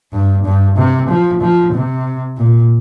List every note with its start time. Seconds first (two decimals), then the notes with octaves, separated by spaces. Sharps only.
0.13 G2
0.45 G2
0.77 C3
1.09 F3
1.41 F3
1.74 C3
2.38 A#2